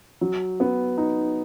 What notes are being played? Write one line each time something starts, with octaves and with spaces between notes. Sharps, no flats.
F#3
B3
D#4